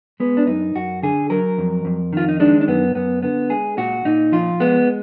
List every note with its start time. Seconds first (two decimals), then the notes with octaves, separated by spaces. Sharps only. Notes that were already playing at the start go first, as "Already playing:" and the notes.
0.20 G#3 B3
0.37 D4
0.47 F#2 D#4
0.75 F#2 F#4
1.03 D3 G#4
1.30 F#3 A#4
1.58 F2
1.85 F2
2.13 D#3 F4
2.28 D#4
2.40 G#3 D4
2.61 D4
2.68 F#2 B3
2.95 F#2 B3
3.23 D3 B3
3.50 G#3 G#4
3.77 A#2 F#4
4.05 A#2 D#4
4.32 F3 F4
4.60 G#3 B3